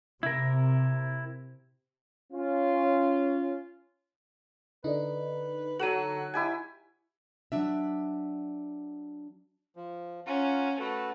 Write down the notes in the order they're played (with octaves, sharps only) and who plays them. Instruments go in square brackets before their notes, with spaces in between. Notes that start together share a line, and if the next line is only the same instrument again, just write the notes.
[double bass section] C3 [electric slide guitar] E4 A#4
[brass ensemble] C#4 F4
[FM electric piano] D3 D#4 [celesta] E4 A4 D5 [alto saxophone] B4
[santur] F#3 F#4 [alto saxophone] A4 [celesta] D#7 E7 F#7
[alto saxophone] D#4 [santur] E4 G4 G#5
[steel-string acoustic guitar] F#3 D4 E5
[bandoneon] F3
[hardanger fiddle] C#4 [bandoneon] F4 F#5 A#5
[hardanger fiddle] A3 [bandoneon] F#4 A4 B4